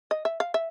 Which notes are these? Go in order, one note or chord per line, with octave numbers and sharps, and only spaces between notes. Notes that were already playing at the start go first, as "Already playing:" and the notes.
D#5
E5
F5
E5